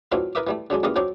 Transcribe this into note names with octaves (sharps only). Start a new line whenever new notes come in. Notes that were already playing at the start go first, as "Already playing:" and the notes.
E3 F#3 A3 C4 D4 F4
E4 A#4 B4 D#5 E5 D6
E3 G3 A3
D3 F#3 G#3 D4
C#2 E3 G3 A#3 F4 D#5
F#3 C4 D4 D#4 C#5 D5